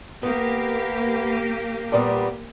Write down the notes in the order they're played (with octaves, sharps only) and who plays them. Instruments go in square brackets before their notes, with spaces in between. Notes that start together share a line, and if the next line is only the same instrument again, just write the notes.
[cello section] A#3 G4 [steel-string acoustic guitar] B3
[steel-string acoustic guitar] A#2 G3 B3